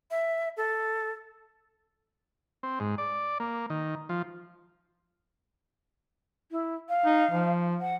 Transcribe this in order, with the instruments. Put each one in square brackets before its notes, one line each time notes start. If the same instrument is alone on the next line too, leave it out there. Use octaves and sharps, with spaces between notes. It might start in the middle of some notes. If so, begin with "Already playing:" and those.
[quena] E5
A4
[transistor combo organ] C4
G#2
D5
A#3
D#3
F3
[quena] E4
F5
[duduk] D#4
F3
[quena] F#5